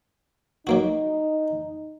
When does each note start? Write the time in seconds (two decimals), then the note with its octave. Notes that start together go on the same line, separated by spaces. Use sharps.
0.67 F#3 A#3 D#4 F#4